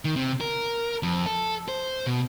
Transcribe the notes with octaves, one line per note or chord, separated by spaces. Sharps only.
D#3
C3
A#4
F2
A4
C5
B2